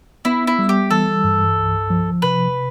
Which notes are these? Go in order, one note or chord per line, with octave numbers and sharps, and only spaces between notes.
B3 E4
E4
G3
G4
E3 A4
G2
C2
F3
C3 B4